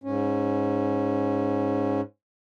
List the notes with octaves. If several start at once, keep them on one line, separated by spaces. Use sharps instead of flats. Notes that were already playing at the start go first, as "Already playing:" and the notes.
G#2 C#4